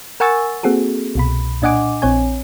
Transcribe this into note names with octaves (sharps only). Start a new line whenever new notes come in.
A#4 F#5 G#5 C#6 E6 A6
A#3 C4 F#4 G#4 A4
C2 B2 B5
A#2 D4 D#5 F#5 G#5 D6
A#1 C4 C#5 G#5